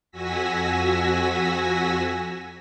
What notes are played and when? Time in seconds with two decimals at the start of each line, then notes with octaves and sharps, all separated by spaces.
0.12 F2 F#4 G#5 E6 A#6 B6